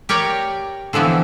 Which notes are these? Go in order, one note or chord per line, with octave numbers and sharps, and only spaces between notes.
G4 A#4 C#5 D5
D3 E3 F3 B3 C4